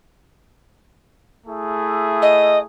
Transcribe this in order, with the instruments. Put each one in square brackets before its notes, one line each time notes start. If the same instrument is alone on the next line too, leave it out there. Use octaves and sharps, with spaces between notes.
[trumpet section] A3 E4 G#4
[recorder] D#5